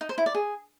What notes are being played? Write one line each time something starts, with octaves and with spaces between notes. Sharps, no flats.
D#4
C5
E4
D5
G#4